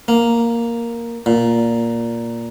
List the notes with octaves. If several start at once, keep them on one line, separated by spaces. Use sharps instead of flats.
A#3
A#2